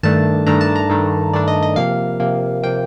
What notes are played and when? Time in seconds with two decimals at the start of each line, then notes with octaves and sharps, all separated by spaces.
0.03 G2 D#3 A3 D4 A5
0.47 G2 D#3 A3 D4 A#5
0.61 A5
0.76 A#5
0.90 G2 D#3 A3 D4
1.33 G2 D#3 A3 D4 D5
1.48 D#5
1.63 D#5
1.76 C3 F3 A#3 F5
2.20 C3 F3 A#3
2.63 C3 F3 A#3 G5